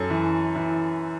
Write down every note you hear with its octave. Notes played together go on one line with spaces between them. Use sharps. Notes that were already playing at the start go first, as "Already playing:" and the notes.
Already playing: F#2 A4
E3
E3